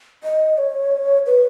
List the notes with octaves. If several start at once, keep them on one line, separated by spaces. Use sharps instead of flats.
D#5
C#5
B4